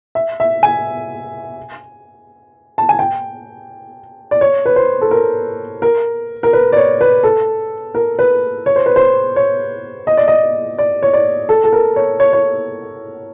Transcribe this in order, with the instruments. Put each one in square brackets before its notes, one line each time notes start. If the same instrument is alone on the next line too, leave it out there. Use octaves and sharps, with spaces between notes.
[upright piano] E5
E5
G#5
A5
G#5
G5
D5
C#5
B4
C5
A4
A#4
A#4
A#4
B4
D5
C#5
B4
A4
A#4
B4
C#5
C5
B4
C5
C#5
D#5
D5
D#5
D5
C#5
D5
A4
A4
A#4
C#5
C#5
C#5